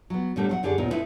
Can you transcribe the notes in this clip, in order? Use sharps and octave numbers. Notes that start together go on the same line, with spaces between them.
F#3 B3
A2 D3 G3 A3 A#3
F#3 C5 F#5
F#2 D3 G4 G#4 D5
D#2 A#2 B3 D#4
A3 A#3 C4 D#4 E4 B4